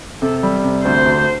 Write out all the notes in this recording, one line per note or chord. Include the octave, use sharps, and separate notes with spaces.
C3 A4
G3
C3
D2 C5
D2